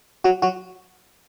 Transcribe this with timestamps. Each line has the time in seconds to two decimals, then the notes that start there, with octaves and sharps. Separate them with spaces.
0.24 F#3 F#4
0.42 F#3 F#4